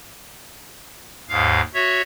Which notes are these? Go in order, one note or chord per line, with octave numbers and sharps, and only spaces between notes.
D#2 G#2 F5
F#4 C#5 E5